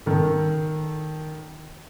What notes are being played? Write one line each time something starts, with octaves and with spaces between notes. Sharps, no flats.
D#3 A4